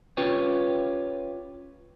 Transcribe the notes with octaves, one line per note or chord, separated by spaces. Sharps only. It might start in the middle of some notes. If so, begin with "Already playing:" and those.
C#4 F4 G4 B4 C#5